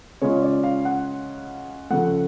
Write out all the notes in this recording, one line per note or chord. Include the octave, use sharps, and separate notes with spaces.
C#3 G#3 C#4 F4 C#5
D5
F5
F#5
C#3 F3 A3 F#5